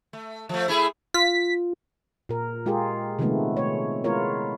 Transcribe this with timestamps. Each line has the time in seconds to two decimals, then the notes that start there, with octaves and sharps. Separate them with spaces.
0.13 A3
0.49 F3 A3
0.68 A3 E4 G#4
1.14 F4 B6
2.29 A#2 A#4
2.66 G#3 F4 G4 G#4 A#4
3.19 C3 D#3 F3 G#3 A3 B3
3.57 A3 C#5
4.04 G#3 B3 E4 F4 A#4 C#5